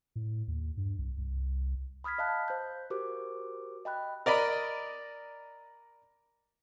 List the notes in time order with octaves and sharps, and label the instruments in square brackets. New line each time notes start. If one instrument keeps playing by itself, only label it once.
[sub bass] A2
D#2
G2
C2
C2
[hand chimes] B5 D#6 F6 G#6 B6
D#5 F5 A5 F#6
C5 G6
F#4 G4 A#4 C5 D6
D#5 G5 B5 F#6
[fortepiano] A#4 D5 D#5 B5